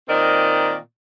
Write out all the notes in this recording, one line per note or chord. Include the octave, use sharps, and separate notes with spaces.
A#2 D#3 C4 A#4 D5 D#5